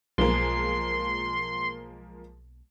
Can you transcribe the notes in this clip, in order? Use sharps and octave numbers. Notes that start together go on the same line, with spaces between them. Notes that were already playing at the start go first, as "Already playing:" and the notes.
B1 F3 G#3 A#3 C6